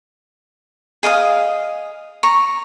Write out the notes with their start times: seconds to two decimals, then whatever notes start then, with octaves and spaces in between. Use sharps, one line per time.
1.03 G#4 D#5 F5 D#6
2.23 A#5 C#6